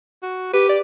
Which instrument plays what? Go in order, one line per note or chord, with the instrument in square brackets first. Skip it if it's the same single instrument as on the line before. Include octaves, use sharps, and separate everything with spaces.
[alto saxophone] F#4
[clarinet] G4 [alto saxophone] B4
[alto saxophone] D5